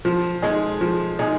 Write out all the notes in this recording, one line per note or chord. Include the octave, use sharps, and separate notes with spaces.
F3
G#3 D#4 G#4
F3
G#3 D#4 G#4